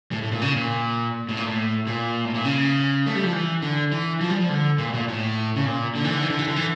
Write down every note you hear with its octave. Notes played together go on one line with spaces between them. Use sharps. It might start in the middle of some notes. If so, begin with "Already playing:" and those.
A2
A2
A#2
C#3
A#2
A2
A#2
A2
A#2
A2
A#2
C#3
A3
G3
F3
E3
D3
E3
F3
G3
F3
D3
A#2
A2
A#2
A2
C#3
A#2
D3
E3
D3
E3
D3
E3
D3
E3